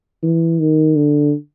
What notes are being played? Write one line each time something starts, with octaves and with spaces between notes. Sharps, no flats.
E3
D#3
D3